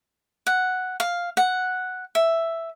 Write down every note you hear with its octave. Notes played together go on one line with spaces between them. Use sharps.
F#5
F5
F#5
E5